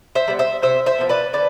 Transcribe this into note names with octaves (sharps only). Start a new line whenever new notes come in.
C5 E5
G3 B3
C5 E5
C3 C5 E5
C5 E5
F3 B3
B4 D5
D3 B4 D5